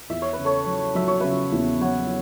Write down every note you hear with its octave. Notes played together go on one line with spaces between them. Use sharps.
E2 E5
C#5
B4
C#3
A4 C#5
F#3
F#3 E5
C#5
C#3 B4 E5
E2
F#3 C#5 F#5